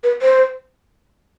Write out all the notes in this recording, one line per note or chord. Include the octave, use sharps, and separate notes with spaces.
B4
C5